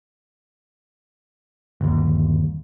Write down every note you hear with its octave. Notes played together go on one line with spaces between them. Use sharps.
G1 D#2